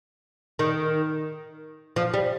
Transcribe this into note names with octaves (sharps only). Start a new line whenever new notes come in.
D#3
F3
G3